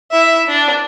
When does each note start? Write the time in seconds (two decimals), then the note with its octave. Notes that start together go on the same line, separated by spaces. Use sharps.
0.12 E4 E5
0.47 D4